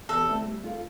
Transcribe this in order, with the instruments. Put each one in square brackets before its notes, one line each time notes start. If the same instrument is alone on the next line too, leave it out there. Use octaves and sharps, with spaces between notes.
[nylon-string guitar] E2 [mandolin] A4
[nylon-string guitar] D3 A3 C4 E4
G3
D4 F4 A4